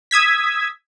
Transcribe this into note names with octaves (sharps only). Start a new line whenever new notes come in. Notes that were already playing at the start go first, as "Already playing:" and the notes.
D#6 E6 G#6 B6